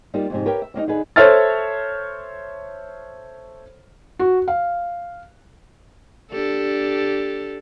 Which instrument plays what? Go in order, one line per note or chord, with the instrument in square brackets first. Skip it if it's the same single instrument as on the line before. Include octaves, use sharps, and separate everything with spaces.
[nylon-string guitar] G3 A#3 D#4 F4
F2 G#2 C3
G4 A#4 B4 C#5 F5 G5
E5
G3 A#3 D4 D#4
D3 D#4 G#4 B4
[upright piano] A4 C5 C#5 E5 F6 A6
[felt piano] F#4
F5
[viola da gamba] D4 G4 A4